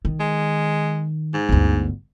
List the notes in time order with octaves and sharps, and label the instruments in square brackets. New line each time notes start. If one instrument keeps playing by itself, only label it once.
[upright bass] D#3
[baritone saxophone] G#3
G#2
[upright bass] G1 D2